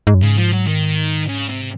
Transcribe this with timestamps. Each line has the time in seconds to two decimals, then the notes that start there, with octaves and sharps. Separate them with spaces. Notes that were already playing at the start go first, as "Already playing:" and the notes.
0.07 G#2
0.14 F#2
0.22 G#2 C#3
0.37 F3
0.53 F#3
0.67 D#3
1.28 C#3
1.49 C3